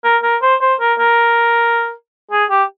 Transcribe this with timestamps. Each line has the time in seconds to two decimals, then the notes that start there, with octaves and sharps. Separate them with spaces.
0.04 A#4
0.23 A#4
0.42 C5
0.61 C5
0.81 A#4
0.99 A#4
2.32 G#4
2.50 G4